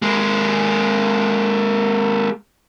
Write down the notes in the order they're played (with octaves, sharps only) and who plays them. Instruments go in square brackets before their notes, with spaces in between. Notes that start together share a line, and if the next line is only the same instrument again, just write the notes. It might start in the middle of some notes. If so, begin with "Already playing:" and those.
[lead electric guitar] G#3 A#3